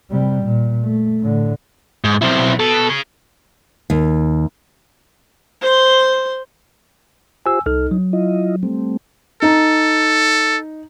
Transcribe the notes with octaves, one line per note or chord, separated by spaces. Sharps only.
C3 G3
A#2
A3
A2 D3
G#2
B1 C4 E4
B2 A4
G#4 C#5
D#2
C5 C6
F4 G4 C5 G#5 E6
C2 D#4 A4 F6
F#3
E4 F4 D#5
G3 A3 C4
D#4 A4